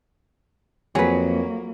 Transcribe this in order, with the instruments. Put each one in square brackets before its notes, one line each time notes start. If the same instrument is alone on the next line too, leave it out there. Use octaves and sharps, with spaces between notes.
[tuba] F2 [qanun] F#3 [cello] A#3 [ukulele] G#4 B4